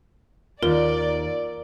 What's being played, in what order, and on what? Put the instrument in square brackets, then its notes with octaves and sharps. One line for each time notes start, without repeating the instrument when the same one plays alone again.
[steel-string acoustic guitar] D#2 [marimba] F4 [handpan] A#4 [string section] D5